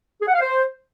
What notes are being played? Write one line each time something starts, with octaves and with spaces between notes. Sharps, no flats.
G#4
F#5
F5
C5